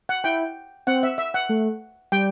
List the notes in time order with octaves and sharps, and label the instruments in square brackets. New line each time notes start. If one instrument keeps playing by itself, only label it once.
[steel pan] F#5
[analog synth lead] E4 [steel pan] G5
[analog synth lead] C4 [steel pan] F#5
[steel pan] E5
E5
F#5
[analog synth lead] A3
[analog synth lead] G3 [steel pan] G5